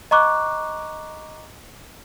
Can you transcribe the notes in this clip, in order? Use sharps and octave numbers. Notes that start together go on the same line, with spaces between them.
D#5 A#5 C#6 D6 F#6